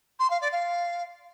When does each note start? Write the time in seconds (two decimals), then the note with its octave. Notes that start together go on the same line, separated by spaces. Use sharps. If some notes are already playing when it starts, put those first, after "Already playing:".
0.19 C6
0.30 F5
0.41 D5
0.51 F5